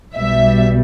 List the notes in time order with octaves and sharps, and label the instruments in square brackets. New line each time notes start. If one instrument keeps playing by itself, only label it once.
[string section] B1 B2 G3 E5